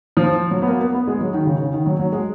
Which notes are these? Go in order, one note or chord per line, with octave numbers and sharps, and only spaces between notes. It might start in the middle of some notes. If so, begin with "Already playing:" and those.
F3
F#3
B3
A#3
B3
B3
G#3
F#3
D#3
C#3
C#3
D#3
F#3
F#3
G#3